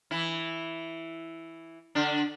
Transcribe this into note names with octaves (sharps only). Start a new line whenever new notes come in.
E3 E4
D3 D4